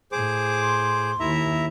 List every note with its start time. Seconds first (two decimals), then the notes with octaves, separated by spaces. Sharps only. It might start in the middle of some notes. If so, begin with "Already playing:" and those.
0.12 A2 G#4 C5 D6
0.62 C6
1.20 D#2 E4 E5 A#5